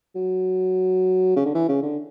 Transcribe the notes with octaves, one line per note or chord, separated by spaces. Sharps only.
F#3
C#3
D3
E3
C#3
D3